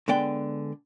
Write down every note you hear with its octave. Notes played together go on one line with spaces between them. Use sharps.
D3 G#3 B3 D5 G5